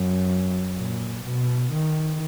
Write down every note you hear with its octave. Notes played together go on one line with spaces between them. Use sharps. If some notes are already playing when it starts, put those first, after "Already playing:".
Already playing: F#2
A#2
B2
D#3